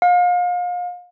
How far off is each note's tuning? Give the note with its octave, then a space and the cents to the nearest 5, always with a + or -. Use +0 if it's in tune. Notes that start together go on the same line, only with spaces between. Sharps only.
F5 +35